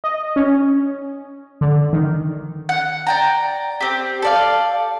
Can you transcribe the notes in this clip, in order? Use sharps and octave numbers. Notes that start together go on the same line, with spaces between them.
D#5
C#4
D3
D#3
F#5
D5 G5 A#5
C4 G4
A4 D5 F5